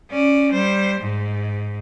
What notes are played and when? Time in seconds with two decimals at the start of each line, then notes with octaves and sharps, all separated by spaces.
0.11 C#4 D5
0.52 G3 C5
1.00 G#2